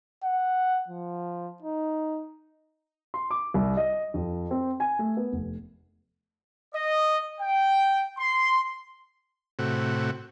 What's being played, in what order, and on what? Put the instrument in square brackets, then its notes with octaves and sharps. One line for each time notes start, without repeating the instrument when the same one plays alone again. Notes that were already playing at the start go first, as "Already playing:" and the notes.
[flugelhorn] F#5
F3
D#4
[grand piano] C6
D6
C2
D#5
F2
C4
G#5
A3
B3
F1
[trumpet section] D#5
G5
C6
[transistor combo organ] A2 C3 F#4